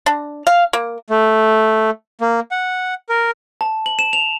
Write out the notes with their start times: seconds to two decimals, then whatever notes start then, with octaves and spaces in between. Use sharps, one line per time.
0.06 D4
0.47 F5
0.73 A#3
1.10 A3
2.21 A#3
2.51 F#5
3.09 A#4
3.61 A5
3.86 F#7
3.99 E7
4.13 F7